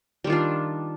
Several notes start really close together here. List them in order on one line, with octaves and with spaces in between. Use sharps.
G3 D#3 F4 D4